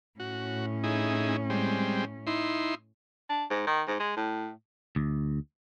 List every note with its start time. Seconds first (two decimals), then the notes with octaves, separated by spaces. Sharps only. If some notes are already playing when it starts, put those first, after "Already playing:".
0.20 A2 C#4 F#4
0.84 D#4 E4 G#4
1.50 G3 G#3 C4
2.27 D#4 E4 C6
3.29 D4
3.50 G#2
3.67 D#3
3.87 G#2
4.00 G#3
4.17 A2
4.96 D2